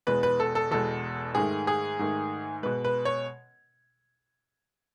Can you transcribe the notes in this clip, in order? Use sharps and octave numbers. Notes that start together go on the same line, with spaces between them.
E2 B2 G#3 B4
B4
A4
A4
E2 B2 G#3 A4
G#2 D#3 A3 G#4
G#4
G#2 D#3 A3
B2 G#3 B4
B4
C#5